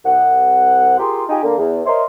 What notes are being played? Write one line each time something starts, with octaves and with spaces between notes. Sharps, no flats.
C2 F#5
F4 G4 G#4 A#4 G5 C6
D#4 F4 G4 G5 G#5
D3 A#3
E2
A#4 C5 C#5 D#5 E5 C6